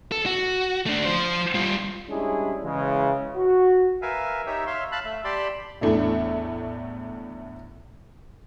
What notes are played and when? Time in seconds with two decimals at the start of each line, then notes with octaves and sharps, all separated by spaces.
0.12 A4
0.26 F#4
0.86 A3 D4
1.05 F3 C5
1.54 G3 F4
2.09 G3 G#3 C#4 D4 E4 G#4
2.64 C#3 E3 G#3
3.36 F#4
4.02 A#4 B4 E5 F5 G#5
4.46 D#4 G4 C#5 E5
4.67 C#5 E5 F5 C6
4.92 F5 A5 B5 F#6
5.05 A3 E5
5.24 G4 D5 A5 B5 C6
5.81 E2 A2 A3 D4 E4